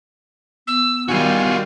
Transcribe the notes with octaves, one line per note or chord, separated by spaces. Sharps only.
B3 E6
D#3 G3 F4 F#4 G#5